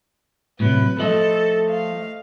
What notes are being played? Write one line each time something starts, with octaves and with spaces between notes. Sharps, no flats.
A2 C3 F#3 B4
F3 A3 A4 D#5
F5